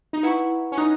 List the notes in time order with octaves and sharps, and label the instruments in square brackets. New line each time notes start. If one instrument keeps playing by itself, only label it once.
[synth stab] D#4
[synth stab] E4 [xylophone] B4 F#5 A#5 C#6
[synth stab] C#4
[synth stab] D#4 [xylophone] D#5 A#5 D#6 F#6